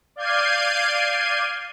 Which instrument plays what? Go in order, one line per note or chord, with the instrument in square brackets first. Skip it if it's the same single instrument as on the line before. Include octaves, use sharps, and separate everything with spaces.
[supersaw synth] D5 F5 G6 G#6 C7 D#7